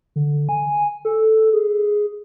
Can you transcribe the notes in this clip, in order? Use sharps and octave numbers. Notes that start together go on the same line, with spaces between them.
D3
G#5
A4
G#4